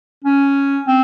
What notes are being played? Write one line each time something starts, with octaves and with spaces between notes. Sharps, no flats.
C#4
C4